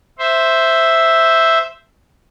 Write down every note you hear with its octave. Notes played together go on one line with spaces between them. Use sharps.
C5 E5